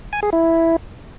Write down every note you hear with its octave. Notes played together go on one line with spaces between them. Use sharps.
G#5
G#4
E4